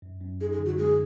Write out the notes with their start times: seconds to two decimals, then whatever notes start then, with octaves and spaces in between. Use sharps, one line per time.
0.02 F#2
0.21 F#2
0.41 D#4 G#4
0.52 G#4
0.59 D3
0.65 F#4
0.78 G#3 G#4